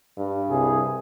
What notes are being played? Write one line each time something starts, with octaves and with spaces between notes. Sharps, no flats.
G2
C2 C3 G#4